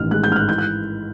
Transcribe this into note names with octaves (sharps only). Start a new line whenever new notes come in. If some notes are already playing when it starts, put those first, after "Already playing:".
Already playing: A1 D#3 F6
G#3 F#6
G6
G#2 F6
F#6
E3 G6
F#6